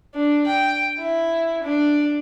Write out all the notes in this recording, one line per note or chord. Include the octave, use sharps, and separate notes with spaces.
D4
G5
E4
D4